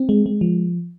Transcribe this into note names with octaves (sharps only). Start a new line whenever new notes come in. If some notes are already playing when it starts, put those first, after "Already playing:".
Already playing: C4
G#3
G#3
F3